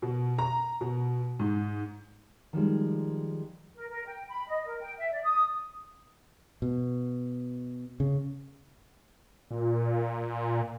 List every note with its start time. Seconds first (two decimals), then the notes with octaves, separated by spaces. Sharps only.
0.02 B2
0.38 A#5
0.81 B2
1.39 G#2
2.53 D#3 F3 G3 G#3
3.74 A#4
3.90 A#4
4.05 G5
4.29 B5
4.47 D#5
4.66 A#4
4.81 G5
4.98 E5
5.12 D5
5.23 D#6
6.62 B2
8.00 C#3
9.51 A#2